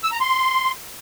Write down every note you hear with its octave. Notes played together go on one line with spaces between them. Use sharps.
E6
A#5
C6